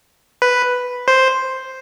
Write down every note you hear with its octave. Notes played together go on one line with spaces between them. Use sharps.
B4
C5